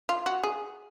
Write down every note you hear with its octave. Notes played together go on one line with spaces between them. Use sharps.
F4
F#4
G#4